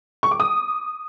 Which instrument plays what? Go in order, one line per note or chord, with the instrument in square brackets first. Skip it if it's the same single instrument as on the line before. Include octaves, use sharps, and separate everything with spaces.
[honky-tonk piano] C#6
D6
D#6